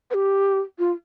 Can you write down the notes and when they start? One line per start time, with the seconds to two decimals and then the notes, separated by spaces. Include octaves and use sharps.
0.11 B4
0.14 G4
0.79 F4